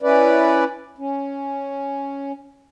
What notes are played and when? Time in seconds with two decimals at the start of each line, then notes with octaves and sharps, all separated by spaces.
0.02 C#4 E4 B4 D5
0.98 C#4